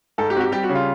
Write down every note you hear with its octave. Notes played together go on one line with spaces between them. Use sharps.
G#2 A4
G4
C4 F#4
G4
G3 G4
F#4
C#3
F4